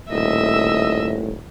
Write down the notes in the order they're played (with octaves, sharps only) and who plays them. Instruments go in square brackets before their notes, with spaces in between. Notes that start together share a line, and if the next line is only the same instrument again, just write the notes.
[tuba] D#1 [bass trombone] A2 [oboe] D#5 [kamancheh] E5 E6